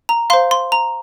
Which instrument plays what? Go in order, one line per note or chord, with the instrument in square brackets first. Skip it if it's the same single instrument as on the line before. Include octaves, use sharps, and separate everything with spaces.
[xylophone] A#5
F5 C6
C5
C6
A#5